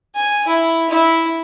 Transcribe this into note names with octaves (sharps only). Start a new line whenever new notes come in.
G#5
E4
E4